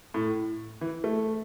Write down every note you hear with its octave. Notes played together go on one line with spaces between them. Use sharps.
A2
E3
A3